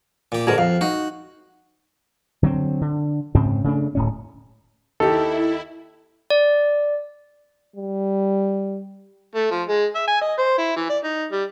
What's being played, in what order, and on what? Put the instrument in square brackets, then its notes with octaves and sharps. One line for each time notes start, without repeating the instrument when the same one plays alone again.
[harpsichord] A#2 G4
[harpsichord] G#2 D3 [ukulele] G#4 A#4
[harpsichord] F2 [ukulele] F5
[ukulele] D#4 [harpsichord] F#4
[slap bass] D3 F#3 A#3 C4
D3
G#2 C#3 C4
C#3 A3 D4
D1 A2 C#4
[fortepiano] D#2 G4 [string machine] E4 [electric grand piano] A4
[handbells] D5
[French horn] G3
[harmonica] A3
F3
G#3
E5
G#5
D#5
C5
E4
E3
D5
D#4
G3